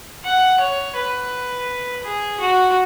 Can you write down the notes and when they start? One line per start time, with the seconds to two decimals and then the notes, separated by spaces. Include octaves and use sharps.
0.24 F#5
0.60 C#5
0.96 B4
2.04 G#4
2.40 F#4